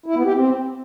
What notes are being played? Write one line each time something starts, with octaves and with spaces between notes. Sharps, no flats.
E4
B3
G4
C4